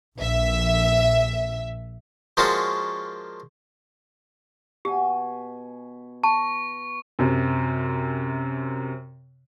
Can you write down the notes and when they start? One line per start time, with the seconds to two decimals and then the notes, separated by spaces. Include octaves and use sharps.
0.19 A#1 E5
2.37 F3 G#3 A#3 C#4 D4 F#4
4.85 B2 G4 G#5
6.24 A5 C#6
7.19 F#2 C3